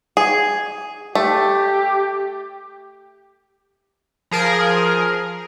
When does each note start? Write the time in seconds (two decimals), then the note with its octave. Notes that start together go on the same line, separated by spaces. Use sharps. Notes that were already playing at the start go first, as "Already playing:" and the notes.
0.17 G#4
1.15 A3 G4
4.31 F3 G#4 A#4